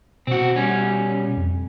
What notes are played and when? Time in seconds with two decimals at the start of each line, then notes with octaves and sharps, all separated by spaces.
0.27 B2 C4 F#4
0.56 G3 C#4
1.37 F2